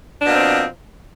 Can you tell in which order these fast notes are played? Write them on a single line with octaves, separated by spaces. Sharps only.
D4 B2 A#3 C4 F3